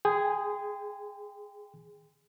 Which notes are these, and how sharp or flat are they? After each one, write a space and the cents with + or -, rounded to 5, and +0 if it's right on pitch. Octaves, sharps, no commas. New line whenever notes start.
G#4 +0 G5 +25 C6 -30